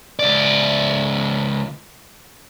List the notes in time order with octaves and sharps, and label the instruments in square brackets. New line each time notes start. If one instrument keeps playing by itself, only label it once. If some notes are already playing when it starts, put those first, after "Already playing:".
[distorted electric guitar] C#2 D5